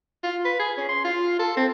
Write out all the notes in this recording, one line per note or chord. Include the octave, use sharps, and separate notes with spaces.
F4
B4
G#4
C#4
C6
F4
A4
C4